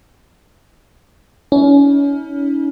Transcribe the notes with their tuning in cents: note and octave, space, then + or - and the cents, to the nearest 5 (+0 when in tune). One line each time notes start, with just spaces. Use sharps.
C#4 +30 E4 -45